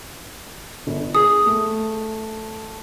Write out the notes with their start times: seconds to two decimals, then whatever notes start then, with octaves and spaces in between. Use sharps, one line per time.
0.87 G1
1.15 G#4 D#6
1.46 A3